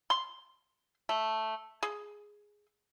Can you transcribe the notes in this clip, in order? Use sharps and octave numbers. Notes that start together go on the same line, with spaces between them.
C6
A3
G#4